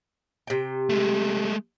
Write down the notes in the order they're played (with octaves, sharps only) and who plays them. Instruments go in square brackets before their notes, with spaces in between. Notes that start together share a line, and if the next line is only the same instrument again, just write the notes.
[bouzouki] C3 G5
[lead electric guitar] G#3 A3